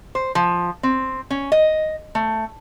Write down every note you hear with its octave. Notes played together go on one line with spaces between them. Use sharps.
C5
F3
C4
C#4
D#5
A3